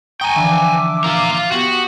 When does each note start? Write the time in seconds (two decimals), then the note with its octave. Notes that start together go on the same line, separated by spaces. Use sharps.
0.21 G5 G#5 A#5 C#6 D#6
0.36 D3 E3 F3 D4 E5 D6
1.04 F4 A#4
1.31 F4
1.52 B3 F#4 G4 F#5